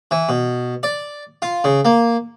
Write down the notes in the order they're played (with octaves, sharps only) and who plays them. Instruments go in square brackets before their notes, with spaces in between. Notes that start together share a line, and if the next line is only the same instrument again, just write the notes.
[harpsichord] E3
B2
D5
F4
C#3
A#3